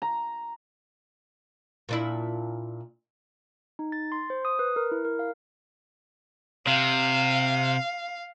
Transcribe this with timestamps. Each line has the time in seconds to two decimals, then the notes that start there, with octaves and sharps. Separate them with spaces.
0.02 A#5
1.89 A#2 D4 E4
3.79 D#4
3.92 A6
4.12 C6
4.30 C5
4.45 D#6
4.59 B4
4.76 A#4
4.91 E4
5.05 A#4
5.19 F5
6.67 C3 F5